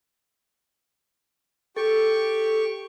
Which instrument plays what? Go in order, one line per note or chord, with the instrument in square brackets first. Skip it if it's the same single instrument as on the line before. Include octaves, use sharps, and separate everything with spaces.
[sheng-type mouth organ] G4 G5 C#6 [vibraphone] A4